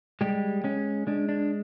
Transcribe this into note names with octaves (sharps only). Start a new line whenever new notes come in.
G3 G#3 G4
G#3 C#4
G#3 D4
D4